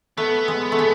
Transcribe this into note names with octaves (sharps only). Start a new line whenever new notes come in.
A3 B3
G#3
A3
G#3